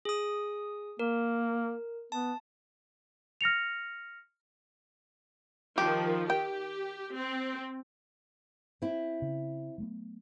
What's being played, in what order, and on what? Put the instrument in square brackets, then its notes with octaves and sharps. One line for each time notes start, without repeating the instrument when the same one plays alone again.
[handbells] G#4 D#6
[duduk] A#3 [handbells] A#4
[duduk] B3 [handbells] A5
[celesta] F6 A#6 C#7 F7
[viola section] D#3 F3 [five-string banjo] G4
[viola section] G4 [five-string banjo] G5
[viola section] C4
[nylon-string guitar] C4 E4
[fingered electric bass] C#3
F#3 A3 B3